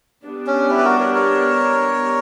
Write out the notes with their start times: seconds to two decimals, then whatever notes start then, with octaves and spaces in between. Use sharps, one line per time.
0.24 G3 B3 D4
0.47 C#4
0.69 E4 G4
0.79 B4
0.84 F#4 A#4
0.99 A#4 C#5
1.14 A#4 C#5